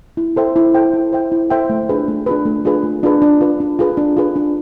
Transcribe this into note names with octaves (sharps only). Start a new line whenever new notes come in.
E4
A4 C5 E5 G5
E4
A4 C5 E5 G5
E4
A4 C5 E5 G5
E4
A4 C5 E5 G5
A3
D4 F4 G#4 B4
A3
D4 F4 G#4 B4
A3
D4 F4 G#4 B4
A3
D4 F4 G#4 B4
D4
F4 G#4 B4
D4
F4 G#4 B4
D4
F4 G#4 B4
D4